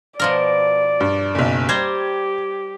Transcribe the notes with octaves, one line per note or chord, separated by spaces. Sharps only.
B2 F3 A#4 D5
G2
F#1 B1
G3 G4 C5 A#5 G#6